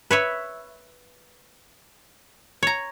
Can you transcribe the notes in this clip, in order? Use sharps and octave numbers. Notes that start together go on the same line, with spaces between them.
B4 C#5 E5
C#5 A#5